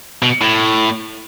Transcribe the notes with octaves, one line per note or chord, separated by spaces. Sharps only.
B2
A2